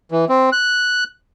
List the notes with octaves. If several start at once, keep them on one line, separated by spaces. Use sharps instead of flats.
E3
C4
F#6